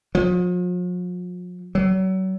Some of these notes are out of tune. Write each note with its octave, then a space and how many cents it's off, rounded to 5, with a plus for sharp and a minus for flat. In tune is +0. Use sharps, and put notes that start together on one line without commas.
F3 +45
F#3 +35